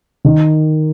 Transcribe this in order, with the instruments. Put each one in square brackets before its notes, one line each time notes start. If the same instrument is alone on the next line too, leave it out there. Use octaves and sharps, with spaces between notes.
[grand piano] D#3